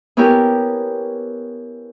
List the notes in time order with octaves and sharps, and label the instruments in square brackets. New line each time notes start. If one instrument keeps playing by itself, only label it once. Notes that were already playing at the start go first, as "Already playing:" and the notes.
[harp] B3 C#4 E4 G4 A#4